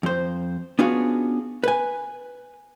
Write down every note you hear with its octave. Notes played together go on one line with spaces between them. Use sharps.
F2 C5
B3 C#4 D4 F4 F#4 G#4
B4 G#5